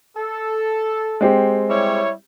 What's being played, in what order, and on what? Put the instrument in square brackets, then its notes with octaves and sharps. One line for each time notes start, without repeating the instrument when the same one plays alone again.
[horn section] A4
[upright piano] G#3 C4 G4
[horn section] G3 E4 C#5